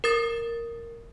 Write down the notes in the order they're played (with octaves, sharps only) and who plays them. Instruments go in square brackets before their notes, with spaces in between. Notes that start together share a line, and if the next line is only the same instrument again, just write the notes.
[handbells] A#4 D#6 A6